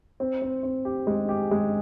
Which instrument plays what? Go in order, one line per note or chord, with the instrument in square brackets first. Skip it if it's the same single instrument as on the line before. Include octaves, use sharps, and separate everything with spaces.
[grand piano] C4
C4
C4
G4
G#3
G4
G#3